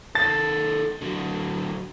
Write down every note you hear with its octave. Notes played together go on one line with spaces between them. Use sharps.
D#3 A4 A6
D3 F#3